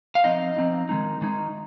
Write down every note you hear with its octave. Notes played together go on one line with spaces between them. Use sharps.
F5
F3 C4 D#4 D#5
F3 C4 D#4
D#3 G#3 D#4
D#3 G#3 D#4